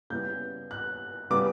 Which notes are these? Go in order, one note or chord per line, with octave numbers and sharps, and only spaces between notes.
C#3 G3 B3 E4 G6
F#6
C#3 G3 B3 D6